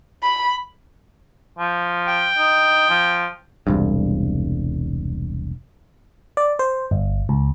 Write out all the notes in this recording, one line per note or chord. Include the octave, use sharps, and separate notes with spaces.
B5
F3
G5
D#4
F3
E1 C2 G2
D5
C5
G1
C#2